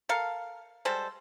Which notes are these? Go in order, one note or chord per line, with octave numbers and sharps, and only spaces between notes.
A4 A#4 F5
G3 G#3 A4 C5